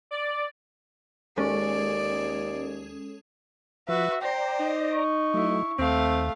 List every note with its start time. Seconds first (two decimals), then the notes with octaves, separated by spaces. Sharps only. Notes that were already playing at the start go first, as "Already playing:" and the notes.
0.11 D5
1.38 D#2 G#3 C#4 A4 D5
3.89 F3 F#4 B4 E5
4.22 C5 D5 G5 A#5
4.60 D#4
4.94 C#6
5.34 F#3 A3 E4
5.79 D#2 A3 C4 F5